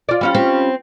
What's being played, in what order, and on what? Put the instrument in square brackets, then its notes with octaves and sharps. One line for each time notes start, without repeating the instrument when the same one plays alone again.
[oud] F4 D5
G3 C#4 F4
[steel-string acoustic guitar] C4